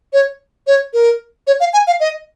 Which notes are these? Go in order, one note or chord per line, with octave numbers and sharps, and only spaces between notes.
C#5
C#5
A#4
C#5
F5
G#5
F5
D#5